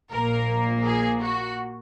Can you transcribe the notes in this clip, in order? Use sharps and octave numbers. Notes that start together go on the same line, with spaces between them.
A#1 A#2 A#3 A#4
G#4
F#4